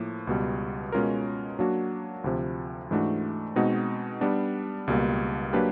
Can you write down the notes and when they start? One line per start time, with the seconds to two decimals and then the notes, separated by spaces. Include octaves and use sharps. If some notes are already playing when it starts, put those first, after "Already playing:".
Already playing: A2 F3 A#3
0.27 C#2 B2 G3
0.92 B2 G#3 C#4 F4 A#4
1.59 F#3 A#3 D4 F#4
2.24 D2 C3 F3
2.91 G#2 E3 A3 D4 F#4
3.56 B2 G#3 C4 D#4 F#4
4.21 G3 B3 D4
4.87 C#2 B2 G3 A#3
5.53 F#3 A#3 D4 G4 B4